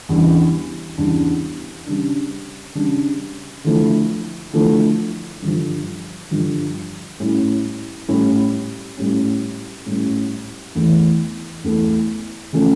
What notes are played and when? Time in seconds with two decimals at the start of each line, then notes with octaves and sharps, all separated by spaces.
0.09 E2 C#3 E3 G3 D4
0.97 E2 C#3 E3 G3 D4
1.86 C#3 G3 D4
2.75 C#3 G3 D4
3.64 D3 F3 A3 E4
4.53 D3 F3 A3 E4
5.42 G2 D3 F3
6.31 G2 D3 F3
7.20 A2 G3 C#4 E4
8.08 A2 G3 C#4 E4
8.97 A2 G3 C#4
9.86 A2 G3 C#4
10.75 E2 E3 A3
11.64 E2 E3 A3
12.53 C#3 F3 A3 C#4